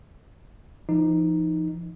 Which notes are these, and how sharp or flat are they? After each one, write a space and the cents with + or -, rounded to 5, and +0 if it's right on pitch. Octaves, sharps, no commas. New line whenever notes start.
F3 -35 D#4 +0